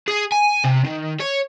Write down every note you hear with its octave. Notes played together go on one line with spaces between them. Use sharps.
G#4
G#5
C3
D#3
C#5